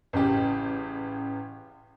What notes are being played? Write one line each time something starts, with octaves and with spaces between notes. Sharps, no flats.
A1 C#3 G4